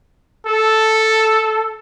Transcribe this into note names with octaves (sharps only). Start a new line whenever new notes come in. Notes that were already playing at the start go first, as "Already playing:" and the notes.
A4